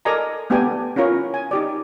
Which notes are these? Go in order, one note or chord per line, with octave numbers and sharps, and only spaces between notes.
A4 A#4 D5 D#5 G#5 A#5
A3 B3 D4 G4 G5 G#5
C#4 E4 F4 A#4 C#5
G#5
D#4 G4 D5